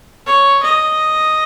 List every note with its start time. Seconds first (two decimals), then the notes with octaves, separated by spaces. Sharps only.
0.27 C#5
0.63 D#5